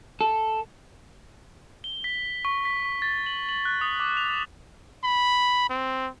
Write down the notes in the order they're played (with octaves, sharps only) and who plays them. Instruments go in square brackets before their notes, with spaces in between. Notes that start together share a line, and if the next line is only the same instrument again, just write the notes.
[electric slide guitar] A4
[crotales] G7
B6
C#6
B6
C#6
A6
F#7
F#7
F#6
D#6
D6
F7
[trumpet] B5
C4